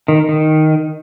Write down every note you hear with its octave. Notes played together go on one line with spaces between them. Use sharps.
D#3
D#3